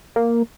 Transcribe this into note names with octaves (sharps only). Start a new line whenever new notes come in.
A#3